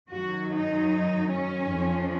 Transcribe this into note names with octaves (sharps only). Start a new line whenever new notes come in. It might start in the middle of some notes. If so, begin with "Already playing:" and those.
F#2 D#3 F#3 F#4
D#4
C#4
F2 F3